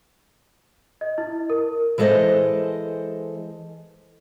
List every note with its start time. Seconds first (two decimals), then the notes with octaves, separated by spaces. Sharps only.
1.01 D#5
1.18 E4
1.50 A#4
1.98 E3 G#3 A4 C5 D#5